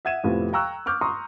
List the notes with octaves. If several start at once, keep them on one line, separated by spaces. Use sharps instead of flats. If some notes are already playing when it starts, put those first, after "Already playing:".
E5 F#5 G#6 D#7 E7
F2 A2 C3 F3 B3
F5 G5 A#5 C#6 E6 F#6
C#6 D6 F6 G6
A#5 C6 C#6 D#6